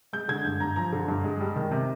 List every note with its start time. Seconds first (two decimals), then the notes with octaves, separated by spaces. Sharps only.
0.13 G#3 G6
0.28 D3 G#6
0.44 G2 G6
0.60 G2 A#5
0.76 F3 A#5
0.92 D3
1.08 G2
1.24 G#3
1.40 G3
1.56 D#3
1.72 C3